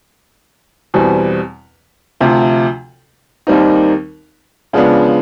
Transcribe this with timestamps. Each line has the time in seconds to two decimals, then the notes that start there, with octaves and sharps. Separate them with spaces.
0.94 E2 B2 G3 C4
2.20 D2 C3 F3
3.47 D#2 D#3 G3 C4 D#4
4.73 C#3 F3 G#3 B3 D4